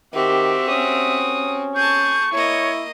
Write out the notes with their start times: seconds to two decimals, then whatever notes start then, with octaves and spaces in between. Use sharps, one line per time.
0.13 D#3 C4 F#4 G4 E5
0.69 C#4 D#6
1.76 G#4 A5 C#6 G6
2.33 A#3 E4 C#5 D#5